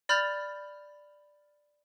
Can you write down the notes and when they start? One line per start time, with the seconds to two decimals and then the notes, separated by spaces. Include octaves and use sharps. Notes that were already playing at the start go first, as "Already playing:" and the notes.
0.09 D5 B5 F6 G6 A6 F7